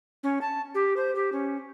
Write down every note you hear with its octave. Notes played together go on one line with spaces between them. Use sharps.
C#4
A5
G4
C5
G4
C#4